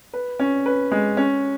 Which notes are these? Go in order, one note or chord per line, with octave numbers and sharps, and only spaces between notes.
B4
C#4
B4
G#3
C#4